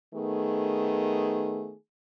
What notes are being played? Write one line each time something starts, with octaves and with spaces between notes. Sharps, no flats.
D#3 A3 B3 G#4